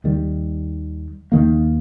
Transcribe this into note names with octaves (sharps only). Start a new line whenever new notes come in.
D#2 D#3 G3
D#2 D#3 A#3